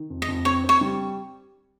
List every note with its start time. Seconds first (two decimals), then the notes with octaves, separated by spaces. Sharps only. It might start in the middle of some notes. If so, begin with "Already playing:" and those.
Already playing: D#3
0.10 F2
0.22 D#5
0.28 F2
0.45 C4 C#5
0.64 C4 C#5
0.81 G3